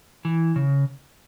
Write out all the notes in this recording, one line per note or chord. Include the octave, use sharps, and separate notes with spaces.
E3
C#3